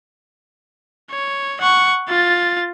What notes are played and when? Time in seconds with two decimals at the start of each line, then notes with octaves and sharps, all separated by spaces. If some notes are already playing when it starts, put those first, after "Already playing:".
1.11 C#5
1.61 F#5 C#6
2.09 F4 A6